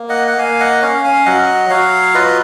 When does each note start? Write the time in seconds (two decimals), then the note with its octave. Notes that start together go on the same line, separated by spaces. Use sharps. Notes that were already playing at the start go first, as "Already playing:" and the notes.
Already playing: A#3
0.09 D#5 F#5
0.28 F#5
0.38 A#3 F5 G#5
0.60 D#5 F#5
0.82 C#4 C#5 F5
1.04 F5 G#5
1.26 F#3 D#5 F#5
1.70 F#3 C#5 F5
2.14 F4 B4 D#5